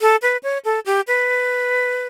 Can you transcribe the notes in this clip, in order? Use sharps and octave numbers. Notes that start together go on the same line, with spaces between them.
A4
B4
C#5
A4
G4
B4